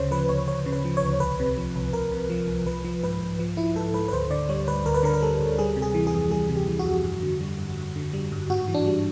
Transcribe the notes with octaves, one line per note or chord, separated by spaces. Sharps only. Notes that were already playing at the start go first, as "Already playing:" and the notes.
Already playing: D2 C#3 C5 C#5
F3 B4
D2 C#5
D2 C#5
C#3
B4
F3
C#5
D2
C2 B4
C3
F3
C2
C2 A#4
C3
F3
C2
F3 B4
F3
G#2 B4
G#2
F3
F3 E4
G#2 A4
G#2 B4
B4
D2 C5
D3 D5
G3 C#5
D2 B4
D2 A#4
B4
D3 A#4
A#4
G3 A4
D2
G3 G#4
C3
G#4
E3
G#4
F2
G3 G#4
C3
G4
E3
F#4
F2
G2
D3
G3
G2
G2
D3
G3
G2
G#2 F#4
E3
D4
G3